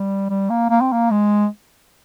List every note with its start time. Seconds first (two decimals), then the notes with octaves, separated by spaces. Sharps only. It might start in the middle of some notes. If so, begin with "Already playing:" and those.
Already playing: G3
0.30 G3
0.50 A#3
0.70 A#3
0.81 C4
0.93 A#3
1.11 G#3